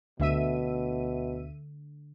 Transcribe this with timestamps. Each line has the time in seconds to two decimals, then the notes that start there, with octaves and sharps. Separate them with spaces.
0.20 D2 B2 D3 E5 D#7